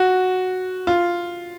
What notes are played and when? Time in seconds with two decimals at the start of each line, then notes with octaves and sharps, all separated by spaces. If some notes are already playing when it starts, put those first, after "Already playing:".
Already playing: F#4
0.87 F4